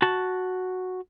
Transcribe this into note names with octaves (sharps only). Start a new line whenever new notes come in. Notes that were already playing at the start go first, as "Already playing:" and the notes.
F#4 A5